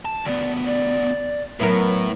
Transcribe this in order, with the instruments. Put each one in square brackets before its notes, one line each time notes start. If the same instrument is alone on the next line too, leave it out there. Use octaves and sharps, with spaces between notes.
[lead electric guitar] A5
[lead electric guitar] D2 B3 [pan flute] D5
[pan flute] D5
[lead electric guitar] A2 [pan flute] F#3 [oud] B3 E4 A#4